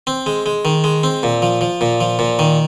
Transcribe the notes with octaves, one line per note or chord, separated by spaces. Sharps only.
C4
G#3
G#3
D#3
G#3
C4
A#2
F3
F3
A#2
F3
A#2
D#3